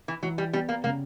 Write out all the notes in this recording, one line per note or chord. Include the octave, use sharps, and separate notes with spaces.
E3
E3 F#3
G3
G3 B3
A#3
C#3 A#3